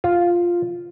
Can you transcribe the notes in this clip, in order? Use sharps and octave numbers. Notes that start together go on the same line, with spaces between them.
F4